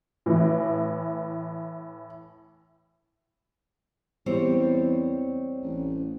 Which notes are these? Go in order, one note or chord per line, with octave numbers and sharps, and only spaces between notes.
A2 E3
E2 G3 C4 C#5
A1